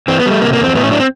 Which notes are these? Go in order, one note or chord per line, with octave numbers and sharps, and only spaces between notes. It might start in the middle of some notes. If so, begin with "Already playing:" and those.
E3 C4
B3
G3
A3
C3 A#3
A#3
E2
C4
A2 B3
C#4
F#3 D4
C4